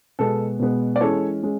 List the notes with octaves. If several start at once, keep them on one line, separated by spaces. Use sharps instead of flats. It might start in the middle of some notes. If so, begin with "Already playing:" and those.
B2 G#3 B3 A4
B2 G#3 B3
D5
E3 G#3 C#4 A4 C#5
G#3 C#4